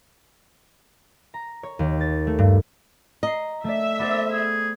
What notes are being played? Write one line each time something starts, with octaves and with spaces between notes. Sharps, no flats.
A#5
C#5
D#2
A6
A3
G2
D#5 A#5 C7
A3 D5 E5
B3 A4 C5 D5
G#4